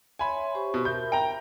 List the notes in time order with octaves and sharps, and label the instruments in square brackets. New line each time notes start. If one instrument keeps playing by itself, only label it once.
[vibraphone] C#5 E5 C6 [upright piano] G#5 B5
[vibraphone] G4 C5 C#6
[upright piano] B2
[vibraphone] A#4 E5 B5 [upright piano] G6
[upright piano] G5 A#5